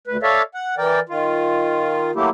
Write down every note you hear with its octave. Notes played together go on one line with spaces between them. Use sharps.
D2 B4
A4 C#5 D5 E5 F5
F#5
E3 A#4 D5 G5
D#3 F4
F#3 A3 A#3 E4 G4